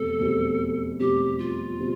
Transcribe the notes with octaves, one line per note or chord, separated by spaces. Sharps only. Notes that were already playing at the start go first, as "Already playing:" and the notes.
Already playing: F1 E2 B2 G3 C4 A4
F1 E2 B2 G3 C4
F1 E2 B2 G3 C4 G4
F4
B2 G3 C4